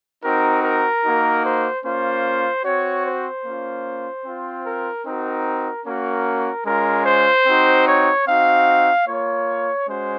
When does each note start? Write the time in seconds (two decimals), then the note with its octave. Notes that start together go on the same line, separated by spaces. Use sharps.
0.23 C4 D#4 F#4 A#4
0.64 A#4
1.04 A#3 D#4 F#4
1.44 C5
1.84 A#3 C#4 F4 C5
2.65 C4 F#4 C#5
3.05 C5
3.45 A#3 C#4 F4
4.26 C4 F4
4.65 A#4
5.06 C4 D#4 F#4 A#4
5.86 A#3 C#4 F#4 A#4
6.66 G#3 C#4 F4 A#4
7.06 C5
7.47 C4 D#4 F#4
7.87 C#5
8.27 C4 D#4 F#4 F5
9.07 A#3 F4 C#5
9.88 G#3 C#4 F#4 C5